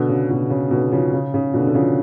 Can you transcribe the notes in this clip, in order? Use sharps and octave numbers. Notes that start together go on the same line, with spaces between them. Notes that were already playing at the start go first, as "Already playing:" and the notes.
Already playing: B2 D3
C#3
B2
C#3
B2 D3
C#3 F3
C#3
C#3
B2 D3
D3
C#3 F3